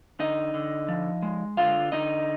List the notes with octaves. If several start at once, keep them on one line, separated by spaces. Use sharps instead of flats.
D3 D#4 D#5
D3
F3
G#3
D3 F4 F5
D3 D#4 D#5